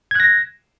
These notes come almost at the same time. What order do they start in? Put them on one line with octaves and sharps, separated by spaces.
G#6 F#6 A#6